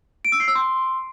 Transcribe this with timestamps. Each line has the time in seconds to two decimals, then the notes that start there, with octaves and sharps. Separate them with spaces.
0.25 D7
0.32 E6
0.40 C7
0.48 E6
0.55 C6